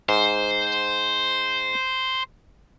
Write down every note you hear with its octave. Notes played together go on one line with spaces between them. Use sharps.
G#2 C5